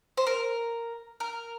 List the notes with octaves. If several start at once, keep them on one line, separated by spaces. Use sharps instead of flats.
C5
A#4
A#4